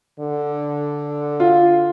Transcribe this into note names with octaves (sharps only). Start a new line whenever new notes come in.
D3
F4